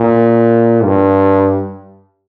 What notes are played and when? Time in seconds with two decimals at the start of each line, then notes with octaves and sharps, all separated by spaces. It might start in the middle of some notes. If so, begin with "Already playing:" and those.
Already playing: A#2
0.84 G2